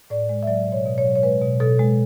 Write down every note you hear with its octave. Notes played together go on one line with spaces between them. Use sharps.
A2 D5
G#3
E5
F#3 D5
B2
C#5
B2
C#5
F#3
C#5
G#3 B4
B2
B2 A4
G#3